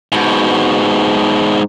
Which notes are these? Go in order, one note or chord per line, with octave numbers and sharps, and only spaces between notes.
G#2 B2